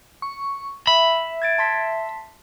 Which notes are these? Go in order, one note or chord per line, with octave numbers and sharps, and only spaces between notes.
C#6
E5 B5
G#6 A6 D7
A5 C6 B6